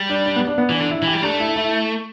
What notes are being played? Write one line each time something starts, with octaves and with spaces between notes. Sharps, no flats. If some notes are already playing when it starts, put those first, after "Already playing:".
Already playing: G3
D4
D4
B3
D4
B3
E3
D4
D3
E4
E3
G4
G3
A3 D4
E4
E4